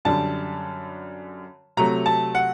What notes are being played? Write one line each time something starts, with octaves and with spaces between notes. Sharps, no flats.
F#2 D3 G3 A5
C3 F#3 A3 A#5
A5
F#5